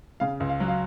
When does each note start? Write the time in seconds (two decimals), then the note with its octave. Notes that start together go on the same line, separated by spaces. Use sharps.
0.20 C#3 F5
0.40 C#2
0.49 F5
0.60 F#3
0.68 F5